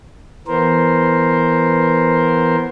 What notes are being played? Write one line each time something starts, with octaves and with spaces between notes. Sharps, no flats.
E3 B3 A#4 C5